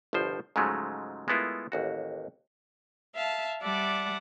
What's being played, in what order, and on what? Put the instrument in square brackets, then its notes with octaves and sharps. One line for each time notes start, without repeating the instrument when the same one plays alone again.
[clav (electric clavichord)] G1 C2 B2 F3 C5
G#2 C#3 F3 F#3 G#3 A3
G#3 A3 B3 E4 F4 A#4
A1 D#2 F#4
[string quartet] E5 F5 A5
G3 D5 E5 F#5 A5 D6